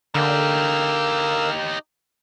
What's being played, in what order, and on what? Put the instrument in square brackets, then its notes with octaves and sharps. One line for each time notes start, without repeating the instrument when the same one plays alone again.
[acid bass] D3 [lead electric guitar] D#4 G4 [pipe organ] A#4 F5 E6